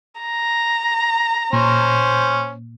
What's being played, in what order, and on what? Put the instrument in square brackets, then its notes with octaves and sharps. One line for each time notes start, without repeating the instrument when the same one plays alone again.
[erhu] A#5
[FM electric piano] A#2 [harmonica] C#4 C5